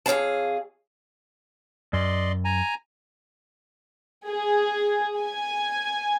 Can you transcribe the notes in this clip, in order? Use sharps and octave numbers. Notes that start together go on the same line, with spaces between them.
F2 G#4 C#5 F5 A5
F#2 D5 D#5 C6
G#5 A#5
G#4
G#5